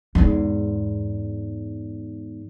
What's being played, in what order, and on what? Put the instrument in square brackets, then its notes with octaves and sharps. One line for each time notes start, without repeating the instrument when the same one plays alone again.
[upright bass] E2 G#2